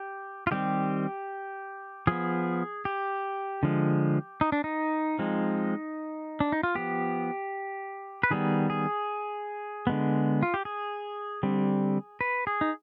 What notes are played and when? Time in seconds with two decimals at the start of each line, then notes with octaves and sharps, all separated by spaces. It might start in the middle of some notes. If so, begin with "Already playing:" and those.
Already playing: G4
0.47 F4
0.51 D#3 G3 C4 G4
2.07 F3 B3 G#4
2.85 G4
3.63 D3 F3 G#3
4.41 D#4
4.52 D4
4.64 D#4
5.19 F3 G#3 C4
6.40 D4
6.52 D#4
6.63 F4
6.75 F3 B3 G4
8.23 B4
8.31 D#3 G3 B3 G#4
8.70 G#4
9.87 D3 G#3 B3
10.43 F4
10.54 G4
10.65 G#4
11.43 D3 G3 C4
12.21 B4
12.47 G#4
12.61 D#4